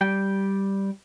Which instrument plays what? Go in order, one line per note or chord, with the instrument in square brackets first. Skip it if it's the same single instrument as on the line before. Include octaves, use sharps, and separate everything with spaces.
[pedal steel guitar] G3 G5